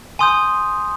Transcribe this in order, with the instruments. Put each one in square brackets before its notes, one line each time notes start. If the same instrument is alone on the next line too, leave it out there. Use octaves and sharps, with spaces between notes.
[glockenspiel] G#5 C6 D#6 G6